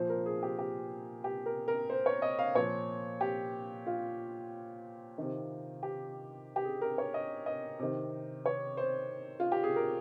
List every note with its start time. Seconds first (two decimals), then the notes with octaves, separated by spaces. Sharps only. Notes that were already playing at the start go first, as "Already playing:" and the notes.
Already playing: A#2 F3 C5
0.09 A#4
0.26 G#4
0.43 G4
0.59 G4
1.24 G4
1.46 A#4
1.68 A#4
1.90 C5
2.06 C#5
2.22 D#5
2.39 F5
2.55 A#2 F3 C#5
3.21 G4
3.87 F4
5.18 C3 D#3
5.83 G4
6.56 G4
6.65 G#4
6.81 A#4
6.98 C#5
7.14 D#5
7.46 D#5
7.79 C3 D#3
8.46 C#5
8.77 C5
9.40 F4
9.52 G4
9.64 G#4
9.76 A#4